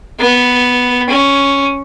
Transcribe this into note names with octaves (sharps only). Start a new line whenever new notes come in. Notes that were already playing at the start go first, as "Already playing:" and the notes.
B3
C#4